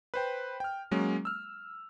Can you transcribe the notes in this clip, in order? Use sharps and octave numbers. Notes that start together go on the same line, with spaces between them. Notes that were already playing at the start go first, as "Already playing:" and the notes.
B4 C5 G5
G5 F6
F#3 G#3 A#3 C#4
E6 F6